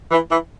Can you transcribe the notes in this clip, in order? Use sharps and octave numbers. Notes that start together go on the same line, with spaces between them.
E3
E3